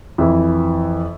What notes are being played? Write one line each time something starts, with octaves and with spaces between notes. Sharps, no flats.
F2 E3 E5